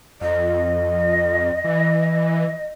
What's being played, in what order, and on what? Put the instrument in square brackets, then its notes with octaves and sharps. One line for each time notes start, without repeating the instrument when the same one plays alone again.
[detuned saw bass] F2 [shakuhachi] D#5
[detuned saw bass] E3